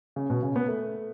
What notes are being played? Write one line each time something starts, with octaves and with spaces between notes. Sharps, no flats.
C#3
B2
C#3
B3
A3